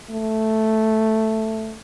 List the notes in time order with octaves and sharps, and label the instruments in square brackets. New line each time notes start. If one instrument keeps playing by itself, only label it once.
[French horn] A3